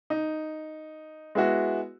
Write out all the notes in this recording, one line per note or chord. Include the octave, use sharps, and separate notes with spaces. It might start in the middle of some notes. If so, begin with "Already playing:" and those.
D#4
G#3 B3 E4 F#4